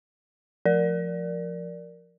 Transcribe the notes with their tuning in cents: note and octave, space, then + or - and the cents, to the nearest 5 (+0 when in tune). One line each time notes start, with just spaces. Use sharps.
F3 +0 A#4 +0 D5 +0